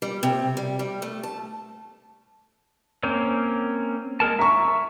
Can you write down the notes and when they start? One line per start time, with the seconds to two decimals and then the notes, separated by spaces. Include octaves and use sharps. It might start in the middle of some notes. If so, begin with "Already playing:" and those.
0.02 G3
0.23 C3
0.57 G3
0.79 G3
1.02 A3
1.23 A5
3.03 A#3 C4 C#4
4.20 G#3 A#4 A5
4.39 E5 A#5 C#6